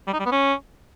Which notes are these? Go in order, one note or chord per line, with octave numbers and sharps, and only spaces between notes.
G3
D#4
G3
B3
C#4